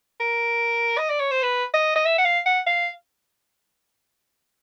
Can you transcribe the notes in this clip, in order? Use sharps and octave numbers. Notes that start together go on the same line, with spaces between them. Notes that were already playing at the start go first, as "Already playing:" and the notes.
A#4
D#5
D5
C#5
C5
B4
D#5
D#5
E5
F#5
F5
F#5
F5